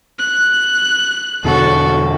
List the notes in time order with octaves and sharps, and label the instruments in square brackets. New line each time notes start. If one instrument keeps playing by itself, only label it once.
[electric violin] F#6
[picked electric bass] E2 B2 D3 [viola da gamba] F#4 A4